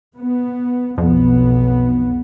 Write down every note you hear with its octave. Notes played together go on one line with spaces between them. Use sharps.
B3
B1 F2 B3